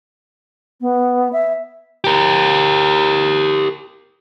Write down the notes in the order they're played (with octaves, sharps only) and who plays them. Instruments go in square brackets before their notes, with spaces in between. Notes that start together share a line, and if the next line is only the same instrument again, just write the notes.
[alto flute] B3
E5
[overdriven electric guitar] G4 A#4